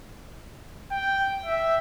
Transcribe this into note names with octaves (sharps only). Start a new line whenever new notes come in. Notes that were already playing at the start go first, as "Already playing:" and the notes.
G5
E5